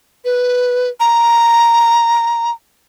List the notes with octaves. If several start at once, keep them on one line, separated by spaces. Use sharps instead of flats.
B4
A#5